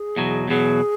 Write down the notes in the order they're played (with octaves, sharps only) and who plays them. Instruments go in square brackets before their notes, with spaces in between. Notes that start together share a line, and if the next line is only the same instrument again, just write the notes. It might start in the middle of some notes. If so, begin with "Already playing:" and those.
Already playing: [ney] G#4
[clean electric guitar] E2 B2 F#3
[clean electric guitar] E2 B2 F#3 [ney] G#4